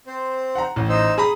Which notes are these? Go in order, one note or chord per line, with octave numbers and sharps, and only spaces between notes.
C4 C5
F#5 A#5
A1
D#4 C5 E6
G#4 A#5 B5 D#6